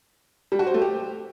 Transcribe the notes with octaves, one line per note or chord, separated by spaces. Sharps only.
G3
F#4
C5
A3
G4